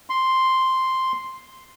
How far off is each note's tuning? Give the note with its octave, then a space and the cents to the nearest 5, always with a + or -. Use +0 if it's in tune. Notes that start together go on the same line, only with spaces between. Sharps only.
C6 +0